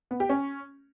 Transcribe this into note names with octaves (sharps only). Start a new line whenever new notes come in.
B3
G4
C#4